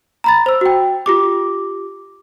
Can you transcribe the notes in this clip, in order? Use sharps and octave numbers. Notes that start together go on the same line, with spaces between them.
A#5 B5 A6
C5 E6
F#4 G5
F4 G4 D6